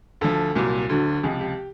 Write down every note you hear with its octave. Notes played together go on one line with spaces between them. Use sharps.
D2 D3 F3 A4
C2 A#2 F#3
D2 D3 F#3
C#2 C3 F3 G#4
G4